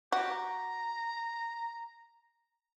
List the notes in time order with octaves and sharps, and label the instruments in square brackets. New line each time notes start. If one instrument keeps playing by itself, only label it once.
[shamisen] F#4 [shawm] G4
[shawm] A#5